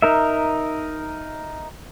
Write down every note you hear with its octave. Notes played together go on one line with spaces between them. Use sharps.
D#4 A#4 E5